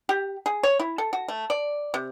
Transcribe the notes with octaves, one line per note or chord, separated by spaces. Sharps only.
G4
G#4
C#5
E4
A4
F#4
A3
D5
C3